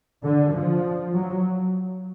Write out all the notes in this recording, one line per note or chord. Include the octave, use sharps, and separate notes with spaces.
D3
F3
F#3